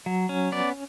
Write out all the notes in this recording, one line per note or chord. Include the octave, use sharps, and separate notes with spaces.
F#3
C#4
B3 D5